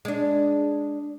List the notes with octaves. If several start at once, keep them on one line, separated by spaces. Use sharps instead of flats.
G#3 D4